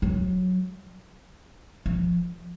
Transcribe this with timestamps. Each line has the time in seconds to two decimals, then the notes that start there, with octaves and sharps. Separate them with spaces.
0.02 F#3
1.86 F3